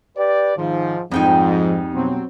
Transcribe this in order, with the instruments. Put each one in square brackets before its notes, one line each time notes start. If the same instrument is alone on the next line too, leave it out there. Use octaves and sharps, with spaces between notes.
[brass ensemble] G4 B4 D5
[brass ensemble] G#2 F3 [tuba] D#3
[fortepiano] F2 D#4 [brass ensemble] G#2 [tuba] F3 [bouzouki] G3 G5 G#5
[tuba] B2 [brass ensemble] F#3 C4